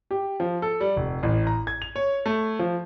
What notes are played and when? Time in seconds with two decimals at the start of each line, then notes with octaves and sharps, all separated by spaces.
0.11 G4
0.40 F3
0.62 A4
0.81 G3
0.96 F1
1.23 A1
1.47 A#5
1.67 G#6
1.82 F7
1.96 C#5
2.26 A3
2.59 F3